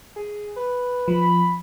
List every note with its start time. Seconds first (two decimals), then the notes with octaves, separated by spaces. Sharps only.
0.16 G#4
0.56 B4
1.08 F3 B5